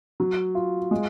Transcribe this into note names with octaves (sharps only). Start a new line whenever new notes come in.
F#3
F4
G#3